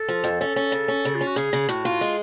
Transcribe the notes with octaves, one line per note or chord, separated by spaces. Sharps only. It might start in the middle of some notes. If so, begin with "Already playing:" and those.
Already playing: A4
F3
F2
C#4 A4
C#4
C#3
C#4
C#3
F4
C#4
F#4
C#3 G#4
C#3
A2 F#4
F4
G#3